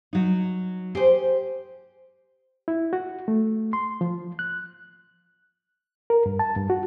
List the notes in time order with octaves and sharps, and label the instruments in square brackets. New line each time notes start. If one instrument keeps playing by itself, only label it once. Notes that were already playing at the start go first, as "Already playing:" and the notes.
[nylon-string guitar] F#3 D#4
[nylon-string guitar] G4 [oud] G#4 C5
[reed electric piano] E4
F#4
A3
C6
F3
F#6
A#4
G2
A5
G2
F#4